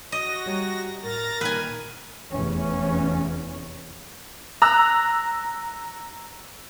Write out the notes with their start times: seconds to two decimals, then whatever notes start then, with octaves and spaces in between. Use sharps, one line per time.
0.12 F#4 D#5 A#6
0.46 G3 C#5 A#5
1.03 A2 A#4 A#5 A6 A#6
1.41 A#2 D#3 G3 B4 G#5 A#5
2.32 F1 E2 E3 C#4
4.62 A#5 E6 F#6